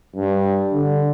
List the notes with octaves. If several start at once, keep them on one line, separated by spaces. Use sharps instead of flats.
G2
D3